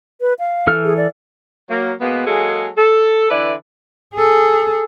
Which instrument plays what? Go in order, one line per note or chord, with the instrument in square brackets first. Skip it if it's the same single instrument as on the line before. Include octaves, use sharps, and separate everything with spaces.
[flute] B4
F5
[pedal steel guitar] E3 A4 F6
[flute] G#4
D5
[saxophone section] F#3 A#3
B2 G#3 A#3 B3
F#3 G#3 A#3 G#4 A4
A4
D3 E3 E4 B4 D5
[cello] G#4 A4